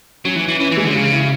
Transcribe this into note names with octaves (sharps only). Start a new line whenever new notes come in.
F#3 C#4
E3
C#4
E3
E3 C#4
E3
G#3
D3
C#3 G#3
E4